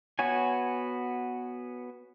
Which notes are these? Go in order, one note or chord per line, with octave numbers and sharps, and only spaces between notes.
B3 F#4 C#5 G#5